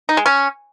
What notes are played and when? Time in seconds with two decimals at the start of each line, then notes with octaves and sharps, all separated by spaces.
0.09 D#4
0.17 G#3
0.26 C#4